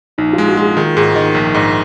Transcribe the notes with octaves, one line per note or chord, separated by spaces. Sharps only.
A#1 D#4
F4
G#3
F#4
G#3 G#4
D#3 G#4
G#2 G#4
D#3 D#5
A#1
G#2 D#5